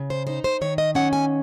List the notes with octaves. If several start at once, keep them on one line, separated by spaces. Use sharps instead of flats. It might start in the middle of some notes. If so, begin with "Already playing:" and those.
Already playing: C#3
C5
D#4 C5
C5
D#3 C#5
D#5
C#4 F#5
G#5